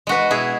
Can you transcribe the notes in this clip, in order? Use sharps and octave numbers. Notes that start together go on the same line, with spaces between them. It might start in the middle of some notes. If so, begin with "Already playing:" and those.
G#3 F#4 B4
B2 E4 G#4